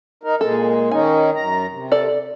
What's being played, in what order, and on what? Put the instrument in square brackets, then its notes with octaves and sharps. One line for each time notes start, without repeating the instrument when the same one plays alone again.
[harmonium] D#4 A#4
[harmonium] A#2 G#3 [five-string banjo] A4
[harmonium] D#3 C#4 D#4 [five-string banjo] G#5
[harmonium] F#2 A#5
C3
[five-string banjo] A4 D5